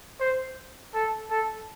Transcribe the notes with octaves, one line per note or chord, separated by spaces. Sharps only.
C5
A4
A4